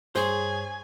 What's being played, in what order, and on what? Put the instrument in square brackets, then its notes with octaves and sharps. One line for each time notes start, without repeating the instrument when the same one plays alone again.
[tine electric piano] G2 C#5 [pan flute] G#4 [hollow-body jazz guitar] C5 [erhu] G#5